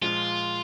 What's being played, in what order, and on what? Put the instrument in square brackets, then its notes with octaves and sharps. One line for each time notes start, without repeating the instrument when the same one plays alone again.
[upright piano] A#2 F3 G#3 [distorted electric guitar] F4